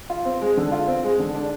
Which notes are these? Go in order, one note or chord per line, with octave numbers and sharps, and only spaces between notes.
F4
C4
G#3
D3
F4
C4
G#3
D3
D4